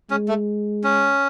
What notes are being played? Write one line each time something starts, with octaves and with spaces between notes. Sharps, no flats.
G#3 C#4
A3
C#4